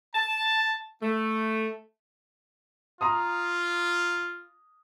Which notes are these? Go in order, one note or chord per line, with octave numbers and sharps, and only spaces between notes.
A5
A3
F4 A#5 C6 D#6